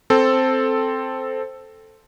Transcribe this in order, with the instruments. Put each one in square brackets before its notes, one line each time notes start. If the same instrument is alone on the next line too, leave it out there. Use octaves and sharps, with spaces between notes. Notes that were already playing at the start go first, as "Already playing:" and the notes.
[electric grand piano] C4 A4